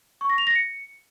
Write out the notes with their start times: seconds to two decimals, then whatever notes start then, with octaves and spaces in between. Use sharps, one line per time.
0.21 C#6
0.30 A#6
0.38 F7
0.47 A#6
0.55 C#7